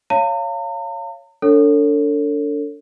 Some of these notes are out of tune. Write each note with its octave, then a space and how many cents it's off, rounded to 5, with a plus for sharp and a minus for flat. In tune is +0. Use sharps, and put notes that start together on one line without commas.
C#5 +5 F5 -20 A#5 -45
D4 -25 A4 +30 C#5 +0